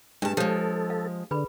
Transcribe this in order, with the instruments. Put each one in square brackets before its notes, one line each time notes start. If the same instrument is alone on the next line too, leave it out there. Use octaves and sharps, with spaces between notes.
[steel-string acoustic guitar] G2 A5 [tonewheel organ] G#3 [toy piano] D4 G4 B4
[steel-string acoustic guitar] F3 G#3 [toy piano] G4 C#5 [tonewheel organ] A4
[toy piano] F5
[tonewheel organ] D3 [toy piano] G#4 B4 B5